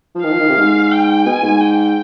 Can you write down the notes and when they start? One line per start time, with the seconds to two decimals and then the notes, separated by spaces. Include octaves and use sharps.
0.15 F3
0.24 D#3 F5
0.32 F3
0.40 D#3
0.49 C3
0.57 G#2
0.91 G5
1.25 B2 G#5
1.43 G#2
1.60 G5